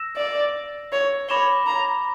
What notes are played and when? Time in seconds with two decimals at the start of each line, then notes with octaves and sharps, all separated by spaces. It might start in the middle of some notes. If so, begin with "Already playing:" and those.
Already playing: E6 A#6 E7
0.16 D5
0.92 C#5
1.29 C#5 B5 D6 A#6 E7 G7
1.66 A#5